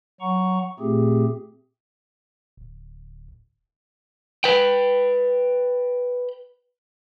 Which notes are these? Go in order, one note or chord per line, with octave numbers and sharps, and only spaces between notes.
F#3 F#5 A#5 C#6
A#2 A3 C4 G4 G#4
D1
B4 G5